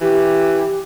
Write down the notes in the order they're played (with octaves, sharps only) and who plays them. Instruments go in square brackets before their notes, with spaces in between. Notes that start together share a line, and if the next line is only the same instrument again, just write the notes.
[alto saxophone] E3 [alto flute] G4